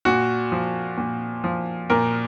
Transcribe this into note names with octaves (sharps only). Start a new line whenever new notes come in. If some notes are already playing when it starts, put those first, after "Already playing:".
A#2 F#4
F3
A#2
F3
A#2 A#4